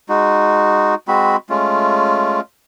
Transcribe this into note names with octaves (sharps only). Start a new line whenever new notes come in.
G#3 D#4 F#4
G#3 C4 F#4 B5
G#3 A3 C#4 F4